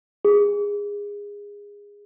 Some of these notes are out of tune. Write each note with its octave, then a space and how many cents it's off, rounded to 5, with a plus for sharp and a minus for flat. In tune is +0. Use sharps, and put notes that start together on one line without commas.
G#4 -25